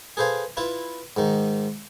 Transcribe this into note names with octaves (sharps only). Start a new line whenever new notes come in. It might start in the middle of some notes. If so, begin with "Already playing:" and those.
G#4 A4 B4 C5 F5 G#5
E4 F4 B4
G#2 D#3